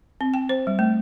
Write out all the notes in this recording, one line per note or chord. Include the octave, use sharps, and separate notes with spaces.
C4
G5
C5
G3
A3